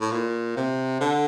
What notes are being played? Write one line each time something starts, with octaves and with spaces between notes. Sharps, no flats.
A2
A#2
C3
D3